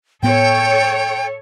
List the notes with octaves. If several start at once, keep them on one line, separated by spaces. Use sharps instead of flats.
A2 B3 A4 C#5 G5